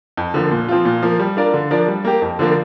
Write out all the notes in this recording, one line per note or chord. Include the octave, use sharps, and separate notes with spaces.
F2
D3 F3 A#3
A#2
F3 C4 F4
A#2
F3 A#3
G3
D4 F4 A#4 D5
D3
F3 D4 A#4 D5
G3
A#3 G4
F2
D3 F3 A#3 D4